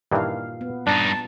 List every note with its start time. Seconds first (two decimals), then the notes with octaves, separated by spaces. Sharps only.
0.12 G2 A#2 D#3 E3 F5
0.61 B3
0.87 G2 D4 D#4 A5